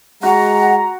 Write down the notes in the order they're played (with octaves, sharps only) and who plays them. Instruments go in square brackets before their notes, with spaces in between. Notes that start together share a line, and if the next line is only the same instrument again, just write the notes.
[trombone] G#3 [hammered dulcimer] F#4 [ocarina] F#5 [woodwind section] A#5